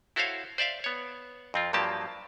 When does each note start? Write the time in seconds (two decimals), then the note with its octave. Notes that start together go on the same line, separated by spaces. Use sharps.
0.16 E4 F#4 A4 C5 C#5 F5
0.58 C5 D5 E5 F5
0.84 B3 C#5
1.54 F2 C4 F4
1.73 G2 F3 F#3 A#3 G4 A5